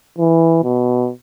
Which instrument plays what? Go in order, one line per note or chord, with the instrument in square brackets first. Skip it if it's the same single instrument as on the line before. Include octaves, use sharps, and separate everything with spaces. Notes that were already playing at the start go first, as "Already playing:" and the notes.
[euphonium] E3
B2